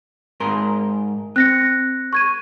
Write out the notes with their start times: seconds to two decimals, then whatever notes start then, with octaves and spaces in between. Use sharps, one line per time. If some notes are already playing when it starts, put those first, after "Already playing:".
0.40 G#2 A#4 C6
1.36 C4 F#6 A#6 C#7
2.13 C#6 G#6 D#7